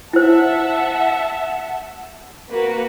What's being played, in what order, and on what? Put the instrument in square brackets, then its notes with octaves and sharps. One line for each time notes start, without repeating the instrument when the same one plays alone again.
[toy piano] E4 C5 [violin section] E5 F#5 A5
[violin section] A#3 F#4 B4